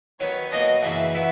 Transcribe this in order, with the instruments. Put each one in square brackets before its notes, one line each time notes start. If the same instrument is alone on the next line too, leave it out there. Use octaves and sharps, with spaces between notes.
[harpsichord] D#3 F#3 B3 [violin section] C#5
[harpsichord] B2 F#3 A#3 [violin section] D#5
[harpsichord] F#2 C#3 E3 A#3 [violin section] E5
[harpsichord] F#3 B3 E4